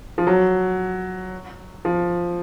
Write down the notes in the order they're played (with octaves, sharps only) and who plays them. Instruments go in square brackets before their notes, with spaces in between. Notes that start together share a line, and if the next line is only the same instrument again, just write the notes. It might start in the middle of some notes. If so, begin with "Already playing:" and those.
[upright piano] F3
F#3
F3